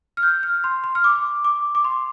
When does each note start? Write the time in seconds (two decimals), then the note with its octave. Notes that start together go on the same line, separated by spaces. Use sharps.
0.17 F6
0.23 G6
0.43 F6
0.64 C6
0.84 C6
0.95 F6
1.04 D6
1.45 D6
1.75 D6
1.84 C6